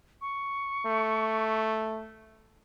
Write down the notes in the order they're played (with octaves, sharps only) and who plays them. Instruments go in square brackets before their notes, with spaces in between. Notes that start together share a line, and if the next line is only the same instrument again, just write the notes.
[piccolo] C#6
[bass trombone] A3